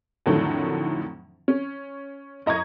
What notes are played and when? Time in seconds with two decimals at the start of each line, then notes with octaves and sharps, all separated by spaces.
0.26 F2 A2 D3 D#3 F#3 A3
1.48 C#4
2.46 F#2 D#5 A#5 C#6 G#6